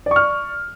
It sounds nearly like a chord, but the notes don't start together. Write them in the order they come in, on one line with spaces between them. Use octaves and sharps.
D5 C#6 F6